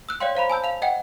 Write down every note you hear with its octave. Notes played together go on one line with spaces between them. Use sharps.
E6 F#6
C#5 D5 F5 G5 C6
C5 F5 A#5 B5
G#5 A5 E6 G6
F5 F7
D#5 F#5 G5